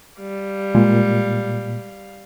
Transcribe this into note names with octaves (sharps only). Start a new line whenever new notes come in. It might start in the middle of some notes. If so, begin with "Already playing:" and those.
G3 F5
A#2 G#3